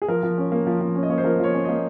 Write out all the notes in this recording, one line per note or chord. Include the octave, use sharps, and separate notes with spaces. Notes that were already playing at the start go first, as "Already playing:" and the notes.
G#4
F3 A#4
F3
C#4
A#3
F3
F3
C#4
D#5
A#3 C#5
C5
F3 A#4
F3 C#5
C#4
D#5
A#3